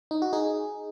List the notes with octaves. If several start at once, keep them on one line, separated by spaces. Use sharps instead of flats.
D#4
F#4
D#4 G#4